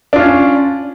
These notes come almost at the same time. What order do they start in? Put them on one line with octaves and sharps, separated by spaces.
D4 F4 C#4